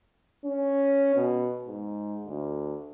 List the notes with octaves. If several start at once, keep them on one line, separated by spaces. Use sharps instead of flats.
C#4
B2
G#2
D2